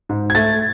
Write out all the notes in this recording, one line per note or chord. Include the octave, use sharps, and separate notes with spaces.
G#2
G#6
A3 A6